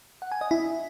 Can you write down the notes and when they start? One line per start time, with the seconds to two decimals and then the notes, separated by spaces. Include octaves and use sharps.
0.22 F#5
0.32 G#5
0.41 D#5
0.51 E4